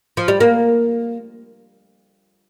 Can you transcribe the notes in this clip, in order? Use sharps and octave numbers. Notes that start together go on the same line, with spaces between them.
F3
G3
A#3